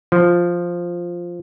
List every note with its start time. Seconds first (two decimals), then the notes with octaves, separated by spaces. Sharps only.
0.12 F3